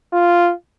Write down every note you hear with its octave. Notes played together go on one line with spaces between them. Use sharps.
F4